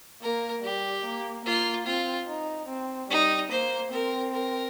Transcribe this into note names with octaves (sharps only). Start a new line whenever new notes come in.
A#3 A#4
G3 G4
A#3
A#3 F4
C4 F4
D#4
C4
G3 D#4
A#3 C5
C4 A#4
A#4